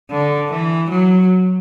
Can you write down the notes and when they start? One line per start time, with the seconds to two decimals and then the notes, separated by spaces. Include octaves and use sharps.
0.11 D3
0.51 E3
0.90 F#3